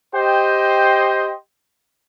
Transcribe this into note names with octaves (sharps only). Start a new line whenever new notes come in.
G4 C5 D#5 G5